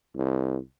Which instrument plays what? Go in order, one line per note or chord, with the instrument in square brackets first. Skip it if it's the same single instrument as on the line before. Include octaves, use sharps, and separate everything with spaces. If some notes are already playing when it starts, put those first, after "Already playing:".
[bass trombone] C2